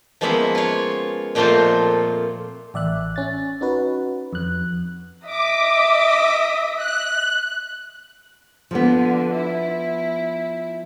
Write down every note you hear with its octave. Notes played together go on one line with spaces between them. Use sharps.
F3 G#3 A#3 B3 C#4 E5
F4 C#5
F2 A#2 A3 F4 A4 C5
A1 D5 E5 F#6
C#4 A6
C#4 D#4 F#4 B4
F2 F#6
D#5 E5 D6
F#6
D3 F3 B3
E4